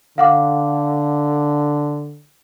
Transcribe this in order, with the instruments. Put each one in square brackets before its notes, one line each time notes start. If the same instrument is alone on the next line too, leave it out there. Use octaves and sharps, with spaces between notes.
[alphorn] D3 [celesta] F5 F#5 D6